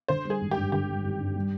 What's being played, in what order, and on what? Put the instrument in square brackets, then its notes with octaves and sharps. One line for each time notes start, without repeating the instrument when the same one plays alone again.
[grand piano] D3 [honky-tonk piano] C5
[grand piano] G3
[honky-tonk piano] G#4
[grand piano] G#1
[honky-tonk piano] G4
[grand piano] G2
[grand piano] D3 [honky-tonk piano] G4
[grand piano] G3
G#1
G2
G3